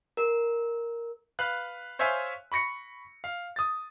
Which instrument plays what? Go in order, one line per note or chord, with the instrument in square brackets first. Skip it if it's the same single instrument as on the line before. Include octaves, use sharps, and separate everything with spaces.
[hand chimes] A#4
[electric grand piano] B4 F5 F#6
C5 C#5 E5 F5 G#5 C6
B5 C#6 A#6 C#7
F5
D#6 A6